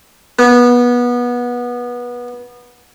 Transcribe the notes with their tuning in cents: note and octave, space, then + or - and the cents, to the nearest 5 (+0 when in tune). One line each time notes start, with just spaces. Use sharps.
B3 -20